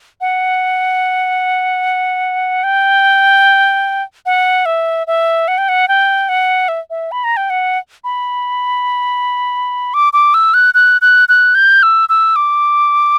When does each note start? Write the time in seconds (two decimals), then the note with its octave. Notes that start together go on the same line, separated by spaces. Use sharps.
0.21 F#5
2.64 G5
4.26 F#5
4.66 E5
5.07 E5
5.48 F#5
5.58 G5
5.69 F#5
5.88 G5
6.29 F#5
6.68 E5
6.90 E5
7.12 B5
7.24 A#5
7.37 G5
7.50 F#5
8.04 B5
9.94 D6
10.13 D6
10.34 E6
10.54 F#6
10.74 F#6
11.02 F#6
11.29 F#6
11.55 G6
11.83 E6
12.09 E6
12.36 D6